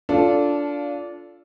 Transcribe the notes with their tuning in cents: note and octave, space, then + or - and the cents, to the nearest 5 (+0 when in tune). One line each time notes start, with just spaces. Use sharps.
D4 -20 F4 +0 A4 +0